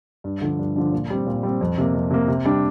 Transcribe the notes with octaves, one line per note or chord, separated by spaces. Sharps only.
G2
D3 F3 D4
G2
D3 F3 D4
A#2
G3 C4
A#2
G3 C4
F2
C3 A#3
F2
C3 A#3
C3
G3 D4